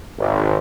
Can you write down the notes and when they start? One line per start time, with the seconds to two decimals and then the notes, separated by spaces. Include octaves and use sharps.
0.19 G#1